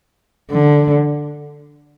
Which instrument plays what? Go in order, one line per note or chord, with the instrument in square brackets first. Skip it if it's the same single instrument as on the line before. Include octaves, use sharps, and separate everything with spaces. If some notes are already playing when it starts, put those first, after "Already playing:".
[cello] D3